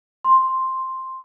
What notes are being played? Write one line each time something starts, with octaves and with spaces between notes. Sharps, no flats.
C6